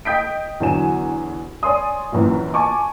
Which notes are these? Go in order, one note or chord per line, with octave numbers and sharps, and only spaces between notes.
D#5 G5 D#6 G6 B6 D7
E2 D3 F#3 G#5 E7
C#5 D5 G#5 C6 D#6
A#1 F#2 E3
G#5 A5 C#6 D6